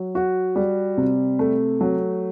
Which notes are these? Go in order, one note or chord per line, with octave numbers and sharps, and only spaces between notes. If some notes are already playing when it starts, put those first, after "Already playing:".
Already playing: F#3
F#4
G3
C3
A3
F#3